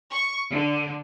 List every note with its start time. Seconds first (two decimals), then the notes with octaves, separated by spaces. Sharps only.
0.11 C#6
0.52 D3